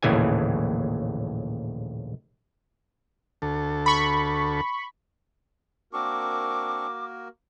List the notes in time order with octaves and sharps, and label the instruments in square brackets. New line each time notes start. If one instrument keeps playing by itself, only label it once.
[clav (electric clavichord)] A#1 D#2 A2 C#3 E3 G#5
[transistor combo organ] D2 A4
[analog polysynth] B5 C#6
[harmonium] A#3 F#4 A#4 [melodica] C4 D4 C#6 [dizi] D6